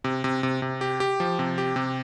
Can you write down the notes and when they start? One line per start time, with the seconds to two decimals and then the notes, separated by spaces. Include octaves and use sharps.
0.04 C3
0.24 C3
0.43 C3
0.62 C3
0.81 G4
1.00 G4
1.20 F3
1.39 C3
1.58 G4
1.76 C3